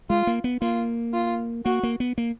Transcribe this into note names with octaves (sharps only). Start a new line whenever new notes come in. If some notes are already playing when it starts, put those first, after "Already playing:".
G#3 F4
A#3
B3
A#3 F4
F4
A#3 F#4
A#3
B3
A#3